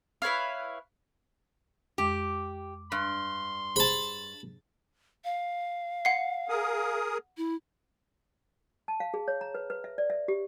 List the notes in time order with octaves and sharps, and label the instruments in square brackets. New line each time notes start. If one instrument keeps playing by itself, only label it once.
[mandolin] E4 B4 C#5 F5
[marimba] F2 G#3 [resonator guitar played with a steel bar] G4
[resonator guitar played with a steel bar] G2 [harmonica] C6
[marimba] G4 G#4 C5 [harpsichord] A5 B5
[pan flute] F5
[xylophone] F#5 C7
[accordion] G#4 A#4 D#6
[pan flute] E4
[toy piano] A5
F5
G#4
C#5
A#5
B4
B4
E5
D5
E5
G4